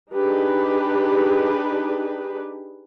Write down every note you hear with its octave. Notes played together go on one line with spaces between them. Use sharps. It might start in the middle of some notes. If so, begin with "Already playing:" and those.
D4 D#4 G4 G#4 B4